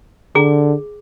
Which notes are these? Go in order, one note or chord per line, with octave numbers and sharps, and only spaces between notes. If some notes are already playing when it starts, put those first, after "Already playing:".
D3 G#4 D6